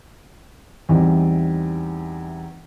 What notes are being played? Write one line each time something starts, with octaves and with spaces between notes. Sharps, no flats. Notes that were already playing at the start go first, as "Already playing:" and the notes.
E2 E3 G3 C4 D#4